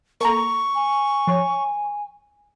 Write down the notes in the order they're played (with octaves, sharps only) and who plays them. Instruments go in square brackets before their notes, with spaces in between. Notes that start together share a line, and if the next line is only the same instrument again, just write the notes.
[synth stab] A#3 A4 A#5 [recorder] C#6
[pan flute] G#5
[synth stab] F3 C#5